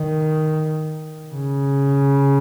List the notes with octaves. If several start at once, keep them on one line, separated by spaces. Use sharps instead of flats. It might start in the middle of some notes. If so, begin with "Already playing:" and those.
Already playing: D#3
C#3